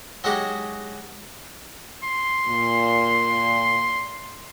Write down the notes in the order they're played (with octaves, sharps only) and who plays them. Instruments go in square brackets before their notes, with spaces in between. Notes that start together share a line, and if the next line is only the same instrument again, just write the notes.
[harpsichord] F#3 G#3 D#4 F#4 G4
[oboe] C6
[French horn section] A#2